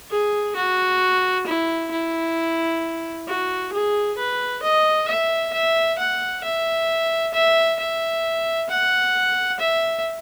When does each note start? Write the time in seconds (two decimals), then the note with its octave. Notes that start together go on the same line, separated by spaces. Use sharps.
0.10 G#4
0.56 F#4
1.46 E4
1.91 E4
3.27 F#4
3.73 G#4
4.17 B4
4.63 D#5
5.08 E5
5.53 E5
5.98 F#5
6.44 E5
7.34 E5
7.79 E5
8.69 F#5
9.60 E5